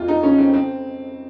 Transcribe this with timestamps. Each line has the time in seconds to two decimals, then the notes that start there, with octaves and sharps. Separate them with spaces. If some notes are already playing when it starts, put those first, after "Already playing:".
Already playing: F2 F4
0.08 D#4
0.23 C#3 C#4
0.38 C4
0.54 C4